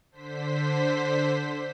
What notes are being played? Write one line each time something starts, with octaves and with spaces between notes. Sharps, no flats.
D3 C5 B6